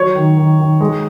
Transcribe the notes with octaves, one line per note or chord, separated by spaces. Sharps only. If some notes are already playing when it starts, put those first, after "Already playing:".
Already playing: F#3 C#5
D#3
D#3
D#3
G#3